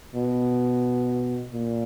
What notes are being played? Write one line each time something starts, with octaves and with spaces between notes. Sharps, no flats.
B2
A#2